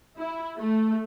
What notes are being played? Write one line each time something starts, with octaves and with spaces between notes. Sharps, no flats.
E4
A3